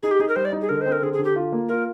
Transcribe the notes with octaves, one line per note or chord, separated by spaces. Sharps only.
D#4 G#4
G4
D#4 G#4
A#4
G3 C5
D5
D#4
G#4
D3 A#4
C4 C5
A#4
D3 G#4
G#4
D3
G4
F4
A#3
F4 A#4